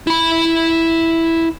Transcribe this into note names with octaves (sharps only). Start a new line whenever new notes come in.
E4 B5